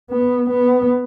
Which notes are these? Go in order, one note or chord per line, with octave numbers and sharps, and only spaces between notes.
B3
B3